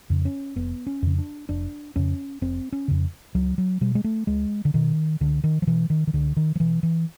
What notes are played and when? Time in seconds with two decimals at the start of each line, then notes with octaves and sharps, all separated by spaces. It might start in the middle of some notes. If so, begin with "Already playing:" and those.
0.10 F2 C#3
0.25 C#4
0.56 F1 B3
0.87 C#4
1.02 F2 C#3
1.18 D4
1.49 F1 D4
1.96 F2 C#3 C#4
2.42 F1 C4
2.72 C#4
2.88 F2 C#3
3.35 C#2 F#3
3.58 F#3
3.81 B2 G3
3.95 G#3
4.04 A3
4.27 C#2 G#3
4.65 D3
4.74 B2 D#3
5.20 C#2 D3
5.44 D#3
5.62 F3
5.67 B2 E3
5.90 D#3
6.07 D#3
6.13 C#2 D3
6.37 D#3
6.55 F3
6.60 B2 E3
6.83 E3